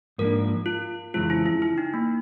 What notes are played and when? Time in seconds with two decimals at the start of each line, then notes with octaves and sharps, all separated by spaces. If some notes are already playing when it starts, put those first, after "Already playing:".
0.18 G#2 F3 A#3 D4 A#4
0.66 F4
1.14 F2 C#3 E3 G#3 C4 F4
1.30 E4
1.46 E4
1.62 E4
1.78 D#4
1.94 A#3